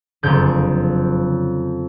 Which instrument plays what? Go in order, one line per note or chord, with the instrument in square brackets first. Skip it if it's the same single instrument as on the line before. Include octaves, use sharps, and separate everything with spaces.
[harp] F#1 F2 D3 G6